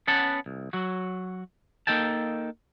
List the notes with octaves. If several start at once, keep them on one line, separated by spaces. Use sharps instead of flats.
B3 C#4 F#5 A5
C2
F#3 F#4
A#3 D#4 A4 G5 A5